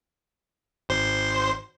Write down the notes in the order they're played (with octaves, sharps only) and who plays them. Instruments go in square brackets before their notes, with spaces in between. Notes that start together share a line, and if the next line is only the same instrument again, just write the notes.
[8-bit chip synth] G#1 C5 C6